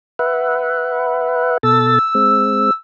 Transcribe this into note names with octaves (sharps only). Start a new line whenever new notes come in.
B4 E5 F#5
B2 A4 E6 A6
G#3 C4